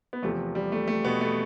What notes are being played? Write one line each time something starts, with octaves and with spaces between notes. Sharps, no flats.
B3
E2 C3 F3 A3
G3
A3
A3
B2 B3
A3